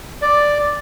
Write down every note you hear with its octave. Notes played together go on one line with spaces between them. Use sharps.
D5